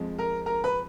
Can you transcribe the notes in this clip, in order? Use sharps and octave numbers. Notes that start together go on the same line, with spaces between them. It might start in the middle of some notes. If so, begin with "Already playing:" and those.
Already playing: F2 F3 G#3
A#4 A#5
A#4 A#5
B4 B5